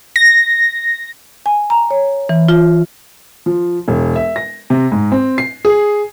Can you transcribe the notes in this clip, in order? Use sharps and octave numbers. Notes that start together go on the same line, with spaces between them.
A#6
G#5
A#5
C#5
E3
F4
F3
E1
E5
A#6
C3
G#2
C4
C7
G#4